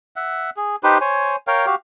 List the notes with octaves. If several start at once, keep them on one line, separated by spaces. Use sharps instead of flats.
E5 F#5
G#4
D#4 G4 B4 C5
C5 C#5 G#5
A#4 C#5 F5 G5
F#4 G4 F5